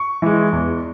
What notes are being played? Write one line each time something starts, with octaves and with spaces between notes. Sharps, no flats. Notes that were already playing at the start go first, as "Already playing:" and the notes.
Already playing: C#6
E3 G#3
E2